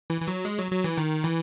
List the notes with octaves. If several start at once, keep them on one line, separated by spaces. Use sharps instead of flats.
E3
E3
F#3
G#3
F#3
F#3
E3
D#3
E3